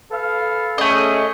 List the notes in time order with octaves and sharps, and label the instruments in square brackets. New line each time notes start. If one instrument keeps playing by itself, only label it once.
[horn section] A4 B4 F5
[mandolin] A3 D#5 [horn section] C#4 G#4